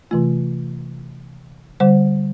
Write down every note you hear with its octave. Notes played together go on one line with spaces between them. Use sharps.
C3 E3 A3 F4
D3 G3 C5